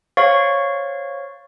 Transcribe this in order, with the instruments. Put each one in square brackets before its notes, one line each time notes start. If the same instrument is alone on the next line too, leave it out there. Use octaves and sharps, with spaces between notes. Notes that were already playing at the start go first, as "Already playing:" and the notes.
[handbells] C5 C#5 F5 C#6 A6